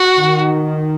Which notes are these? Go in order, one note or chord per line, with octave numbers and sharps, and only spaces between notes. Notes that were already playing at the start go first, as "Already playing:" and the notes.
Already playing: F#4
D#3